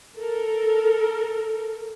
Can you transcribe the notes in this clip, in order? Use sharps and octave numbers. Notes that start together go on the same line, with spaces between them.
A4 A#4